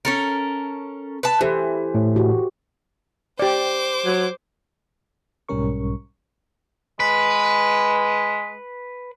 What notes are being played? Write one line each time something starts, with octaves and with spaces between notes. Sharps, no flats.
C#4 A4 A#4
B4 A5
E3 G4 A4 C5
A2
F#4 G4
G4 C5 D5 D6
F#3
B1 G#2 G3 C#4 A#4 C#6
G#3 B4